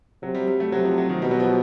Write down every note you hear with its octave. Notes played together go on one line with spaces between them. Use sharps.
C3 F#3
G3
G3
A3
C3 F#3
F3
F#3
D#3
B2 G3
F#3
F3